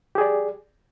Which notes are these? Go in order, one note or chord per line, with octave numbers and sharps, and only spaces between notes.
G4 G#4 D5